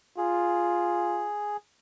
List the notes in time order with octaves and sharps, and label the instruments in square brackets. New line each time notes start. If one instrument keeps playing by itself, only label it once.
[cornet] F4 [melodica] G#4